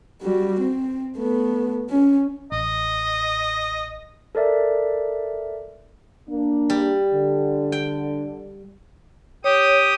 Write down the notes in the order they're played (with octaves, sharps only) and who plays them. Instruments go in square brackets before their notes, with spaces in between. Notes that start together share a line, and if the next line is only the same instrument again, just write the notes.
[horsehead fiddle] G3 F#4
C4
A3 B3
C#4
[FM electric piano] A1 [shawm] D#5
[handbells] A4 A#4 D5 E5
[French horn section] A#3 D4
[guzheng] G3
[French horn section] D3
[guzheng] G5
[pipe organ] G4 D#6 [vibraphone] C#5